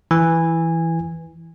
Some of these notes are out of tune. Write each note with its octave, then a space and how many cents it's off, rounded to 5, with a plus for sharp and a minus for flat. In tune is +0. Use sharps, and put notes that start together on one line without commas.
E3 +0 G#5 -15